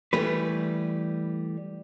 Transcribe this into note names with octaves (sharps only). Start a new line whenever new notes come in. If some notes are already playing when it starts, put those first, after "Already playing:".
E3 G3 A3 B4